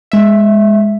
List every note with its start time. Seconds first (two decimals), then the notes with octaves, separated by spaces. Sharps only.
0.12 G#3 E5